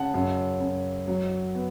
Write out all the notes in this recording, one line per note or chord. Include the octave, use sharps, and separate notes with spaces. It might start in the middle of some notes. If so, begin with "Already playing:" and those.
Already playing: C#3 F#5 A5
F#2
F#2
F#3
B3